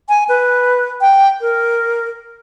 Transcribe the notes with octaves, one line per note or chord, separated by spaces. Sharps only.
G#5
B4
G5
A#4